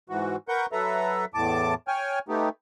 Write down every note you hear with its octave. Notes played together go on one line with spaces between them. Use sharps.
G#2 E3 F#4
A#4 B4 F#5 C#6 G6
F#3 A4 B4 E5 A#5
E2 A2 A5 D6
C#5 G5 G#5 F6
A3 B3 D#4 G4